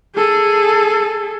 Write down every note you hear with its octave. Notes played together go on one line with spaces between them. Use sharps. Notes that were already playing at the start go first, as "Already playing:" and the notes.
G#4 A4